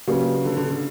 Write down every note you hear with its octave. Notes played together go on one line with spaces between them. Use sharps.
C#3 F#3 A#3 D4 G4 B4
D3
D3
D3